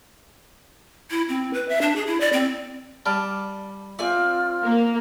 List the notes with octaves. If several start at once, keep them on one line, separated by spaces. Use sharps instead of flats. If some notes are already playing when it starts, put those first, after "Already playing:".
E4
C4
B4
E5
D4
G#4
E4
D5
C4
G3 D5 A5 F6
A3 C4 F4 D5 G#5
A#3